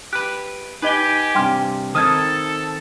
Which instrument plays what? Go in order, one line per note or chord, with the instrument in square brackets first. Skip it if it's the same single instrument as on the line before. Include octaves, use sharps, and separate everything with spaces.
[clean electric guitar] G4 B4 [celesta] F#6
[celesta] D#4 D#5 G7 [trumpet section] G4 G#5 [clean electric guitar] B4
[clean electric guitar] G2 C3 [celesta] G5 C6 F6
[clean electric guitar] D#3 C4 D#5 [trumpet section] A4 [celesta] D#6 F6 G#6